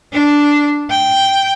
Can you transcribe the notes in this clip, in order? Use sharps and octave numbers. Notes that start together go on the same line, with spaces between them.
D4
G5